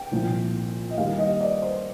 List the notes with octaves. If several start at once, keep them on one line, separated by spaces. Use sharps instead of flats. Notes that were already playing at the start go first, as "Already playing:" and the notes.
Already playing: G5
C2 A#2 F3
D#5
D#2 D#3 G3 F5
D#5
D5
C5